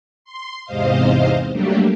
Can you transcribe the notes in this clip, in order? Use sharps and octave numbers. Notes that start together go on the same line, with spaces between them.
C6
E2 G#2 C3 C5 D#5 F5
F#3 G3 A3 A#3 D4 G4